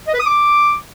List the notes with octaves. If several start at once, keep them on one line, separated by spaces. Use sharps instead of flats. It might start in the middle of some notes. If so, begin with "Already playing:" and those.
D#5
B4
D#6
D6